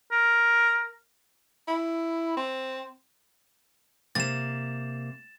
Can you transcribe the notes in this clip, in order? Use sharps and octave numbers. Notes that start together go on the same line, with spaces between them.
A#4
E4
C4
C3 A#3 A6 E7